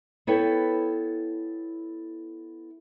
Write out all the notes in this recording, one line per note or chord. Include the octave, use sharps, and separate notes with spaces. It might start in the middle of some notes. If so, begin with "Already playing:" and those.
B3 E4 A4 B4 C#5 G5